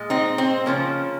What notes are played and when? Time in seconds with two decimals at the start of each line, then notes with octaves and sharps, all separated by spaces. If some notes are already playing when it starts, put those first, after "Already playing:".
Already playing: A#2 G#3
0.10 C4 D#4
0.38 C4
0.66 C#3 F3 A#3 C#4